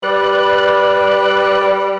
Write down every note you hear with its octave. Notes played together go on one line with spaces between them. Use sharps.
G3 B4 D5 F#6